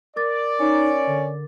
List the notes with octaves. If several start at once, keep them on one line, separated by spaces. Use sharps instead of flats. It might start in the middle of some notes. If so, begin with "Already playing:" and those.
A#4 D5 D6 A6
C#4 D#4
D3